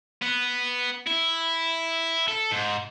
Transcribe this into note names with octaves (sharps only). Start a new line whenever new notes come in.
B3
E4
A4
G#2